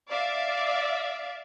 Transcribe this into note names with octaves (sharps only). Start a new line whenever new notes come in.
D5 E5 F5